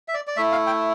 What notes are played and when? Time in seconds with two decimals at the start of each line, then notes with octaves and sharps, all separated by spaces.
0.08 E5
0.14 D5
0.27 D5
0.37 A3 E4 E5
0.52 F5
0.67 G5